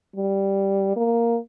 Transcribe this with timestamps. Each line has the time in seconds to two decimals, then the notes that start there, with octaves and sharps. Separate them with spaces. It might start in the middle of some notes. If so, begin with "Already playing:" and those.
0.16 G3
0.96 A#3